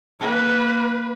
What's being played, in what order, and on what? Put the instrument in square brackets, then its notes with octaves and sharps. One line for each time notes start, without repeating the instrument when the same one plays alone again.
[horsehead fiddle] A#3 B4